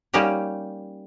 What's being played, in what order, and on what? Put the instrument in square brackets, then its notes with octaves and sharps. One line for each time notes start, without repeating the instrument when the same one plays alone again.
[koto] G3 A#3 C#4 D#4 G4